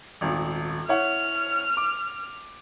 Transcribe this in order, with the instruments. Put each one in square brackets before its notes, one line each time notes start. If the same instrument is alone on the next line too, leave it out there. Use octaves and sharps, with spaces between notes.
[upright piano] D#1 G#1
[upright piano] E4 C#5 F#5 [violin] F6
[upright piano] D6